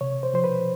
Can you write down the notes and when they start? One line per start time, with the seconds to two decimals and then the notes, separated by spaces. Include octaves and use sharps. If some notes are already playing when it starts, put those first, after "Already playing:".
0.01 C3 C#5
0.23 C5
0.34 F3 C5
0.44 B4